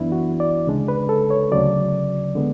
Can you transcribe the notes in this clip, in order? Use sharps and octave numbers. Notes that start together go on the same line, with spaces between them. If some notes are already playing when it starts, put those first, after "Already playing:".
Already playing: F#2 E3 B3 D4 E4
F#4
D5
D2 C#3 G#3 D4
B4
A4
C#5
D2 C#3 F#3 D5
D3 G#3 B3